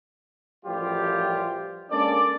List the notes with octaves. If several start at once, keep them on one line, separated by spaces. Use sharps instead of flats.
A1 F#2 F3 G3 F4 G4
G#3 A#3 C#4 D4 A4 D5